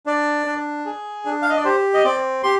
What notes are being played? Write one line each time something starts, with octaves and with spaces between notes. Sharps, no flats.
D4 D5
D4
G#4
D4
F5
D#5
D5
G4 C5
D#5
C4 D5
G4 C6